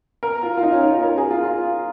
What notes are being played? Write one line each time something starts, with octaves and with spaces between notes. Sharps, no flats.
A#4
F4
F4
D#4
C#4
D#4
F4
A#4
G#4
F4
F4